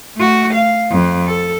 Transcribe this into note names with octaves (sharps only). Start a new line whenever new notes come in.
A3 F#4
F5
F2
A4